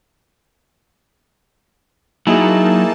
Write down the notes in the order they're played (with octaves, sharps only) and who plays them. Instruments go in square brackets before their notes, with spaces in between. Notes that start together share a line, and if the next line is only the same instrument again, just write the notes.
[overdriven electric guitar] F#3 [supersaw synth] A#3 D#4 A5 [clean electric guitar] E4 [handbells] G#4 G#5